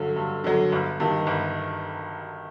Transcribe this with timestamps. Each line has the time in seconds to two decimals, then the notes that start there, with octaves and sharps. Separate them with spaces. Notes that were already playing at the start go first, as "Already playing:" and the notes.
Already playing: G2 D3 F#3
0.16 G2
0.44 D3 F#3
0.72 G1
1.00 G2 D#3
1.27 G1